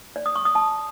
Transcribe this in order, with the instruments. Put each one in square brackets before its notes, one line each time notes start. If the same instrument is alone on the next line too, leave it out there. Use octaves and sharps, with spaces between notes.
[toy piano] D5
D#6
C#6
D#6
A5